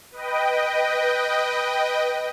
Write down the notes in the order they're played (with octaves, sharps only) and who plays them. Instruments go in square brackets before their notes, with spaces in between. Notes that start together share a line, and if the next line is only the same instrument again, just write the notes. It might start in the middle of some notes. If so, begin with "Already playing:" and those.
[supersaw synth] B4 D#5 G5